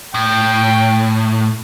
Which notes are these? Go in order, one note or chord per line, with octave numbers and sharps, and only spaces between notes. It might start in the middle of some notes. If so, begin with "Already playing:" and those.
A2 G5